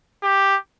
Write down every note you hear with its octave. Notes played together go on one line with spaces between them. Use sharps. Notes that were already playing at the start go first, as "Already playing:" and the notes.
G4